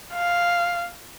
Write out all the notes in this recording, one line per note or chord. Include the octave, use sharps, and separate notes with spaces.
F5